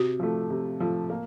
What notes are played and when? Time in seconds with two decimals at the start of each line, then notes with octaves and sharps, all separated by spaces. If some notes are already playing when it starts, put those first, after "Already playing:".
Already playing: C3 F#4
0.20 F3 A3
0.50 C3
0.80 F3 A3
1.10 A#3